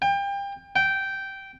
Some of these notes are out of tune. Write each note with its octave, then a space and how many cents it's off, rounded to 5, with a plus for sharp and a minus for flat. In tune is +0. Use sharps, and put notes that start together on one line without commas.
G5 +30
G5 -10